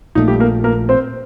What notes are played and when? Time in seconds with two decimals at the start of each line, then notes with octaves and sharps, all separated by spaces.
0.15 A#1 A#2 A3 D#4
0.28 G3 G4
0.40 A#3 A#4
0.64 A#3 A#4
0.89 C4 C5